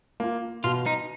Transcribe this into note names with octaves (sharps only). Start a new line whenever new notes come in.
A#3 F4
B2 F4
D#4